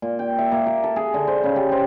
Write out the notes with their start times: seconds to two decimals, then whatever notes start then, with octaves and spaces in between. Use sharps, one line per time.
0.02 A#2
0.19 G5
0.38 E5
0.52 A#3
0.66 A#4
0.83 A4
0.96 G#4
1.14 D3
1.27 C5
1.44 C#3
1.56 G4
1.72 C5